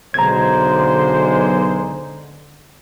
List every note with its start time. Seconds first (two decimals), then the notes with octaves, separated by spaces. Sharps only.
0.14 B1 D3 G#3 C5 A#5 G#6